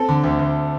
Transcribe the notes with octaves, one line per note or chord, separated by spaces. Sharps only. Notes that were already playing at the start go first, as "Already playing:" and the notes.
Already playing: C4 A4
D3
D2
D2